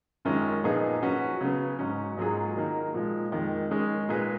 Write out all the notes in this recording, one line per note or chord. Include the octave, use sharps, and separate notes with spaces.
F#2 D#3 G#3 C#4 F4
A#2 F3 B3 D#4 G#4
F#3 C#4 F#4 B4
C#3 F#3 B3
G#2 F#3 C#4
G#2 F#3 A#3 F4 G#4
D#3 F#3 A#3 D#4
A#2 F3 G#3
F2 D#3 G#3
D#3 G#3 C#4 G#4
A#2 G#3 D#4 G#4 B4